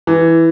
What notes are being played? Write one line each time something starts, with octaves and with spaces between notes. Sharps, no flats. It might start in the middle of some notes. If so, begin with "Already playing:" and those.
E3